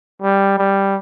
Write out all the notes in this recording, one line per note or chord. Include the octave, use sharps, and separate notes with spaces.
G3
G3